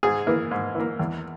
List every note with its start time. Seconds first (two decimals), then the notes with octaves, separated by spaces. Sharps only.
0.03 G#2 G#4
0.27 E3 A#3
0.51 G#2
0.75 E3 A#3
0.99 E2